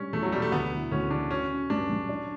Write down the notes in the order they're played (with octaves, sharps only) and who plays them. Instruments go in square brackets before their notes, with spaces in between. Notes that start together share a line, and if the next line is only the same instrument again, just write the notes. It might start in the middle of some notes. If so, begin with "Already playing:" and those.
Already playing: [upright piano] G3 D4 [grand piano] C#4
[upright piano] E2 [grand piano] A3
[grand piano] F#3
[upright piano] B2 [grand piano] G3
[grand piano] A3
[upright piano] D2 [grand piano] B3
[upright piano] E3
[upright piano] D2 [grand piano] C#4
[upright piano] C#3 [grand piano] D4
[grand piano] C#4 [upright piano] F#4
[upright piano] C#4
[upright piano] G2 [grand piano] D4
[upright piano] F#3
D4